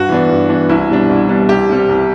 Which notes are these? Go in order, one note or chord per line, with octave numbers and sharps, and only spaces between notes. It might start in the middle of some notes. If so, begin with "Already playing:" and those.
Already playing: G2 F#4
E3 B3 D4
G2
E3 B3 D4
C2 E4
B2 G3 D4
C2
B2 G3 D4
C2 G4
C3 G3
C2